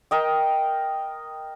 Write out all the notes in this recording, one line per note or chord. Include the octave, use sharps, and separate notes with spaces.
A#4 D#5 G5